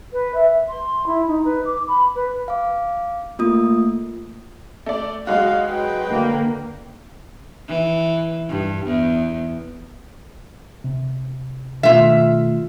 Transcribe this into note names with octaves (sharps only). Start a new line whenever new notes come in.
B4
E5
C6
E4
D#4
B4
D6
B5
B4
F5 D6
A3 A#3 F4 D#6
A3 D5
F#3 G#3 F#4 F5
B4 G5
D3 A#3
E3
G2
E2
C3
B2 D#3 A3 F4 E5